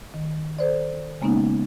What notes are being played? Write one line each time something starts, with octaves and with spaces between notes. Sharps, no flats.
D#3
A4 C5 D5
C#3 G#3 A#3 B3 C#4 D#4